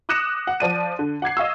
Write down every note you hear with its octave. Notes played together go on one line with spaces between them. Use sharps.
D6 D#6 F#6 A#6 C#7 E7
F#5
F3 D5 D#7
D3
F#5 D6 G#6 C7
D#5 F5 C#6 E6